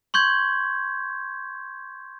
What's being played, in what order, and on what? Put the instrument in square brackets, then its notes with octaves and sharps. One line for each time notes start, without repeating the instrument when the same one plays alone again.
[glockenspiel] C6 C#6 G6 G#6